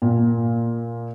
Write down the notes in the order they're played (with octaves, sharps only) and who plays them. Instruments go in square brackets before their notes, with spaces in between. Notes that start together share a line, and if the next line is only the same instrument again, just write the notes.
[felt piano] A#2